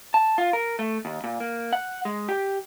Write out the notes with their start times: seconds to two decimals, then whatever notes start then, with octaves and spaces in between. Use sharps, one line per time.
0.14 A5
0.38 F4
0.53 A#4
0.79 A3
1.05 D#2
1.24 A#2
1.40 A#3
1.73 F#5
2.05 G#3
2.29 G4